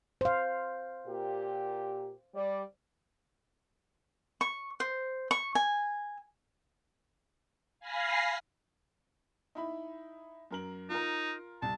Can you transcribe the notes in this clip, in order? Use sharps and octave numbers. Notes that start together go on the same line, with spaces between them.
C5 F5
A#2 G4
G3 D5
C#6
C5
C#6
G#5
F5 G#5 B5 A#6 C7
D#4 E4 B5
F#2 A#4 F#7
D#4 F4 A#4
C2 A5